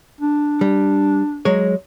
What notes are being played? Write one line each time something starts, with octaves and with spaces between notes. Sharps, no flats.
D4
G3
F#3 G#3 C#5